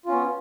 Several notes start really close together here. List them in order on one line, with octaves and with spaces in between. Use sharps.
F4 C#4 B3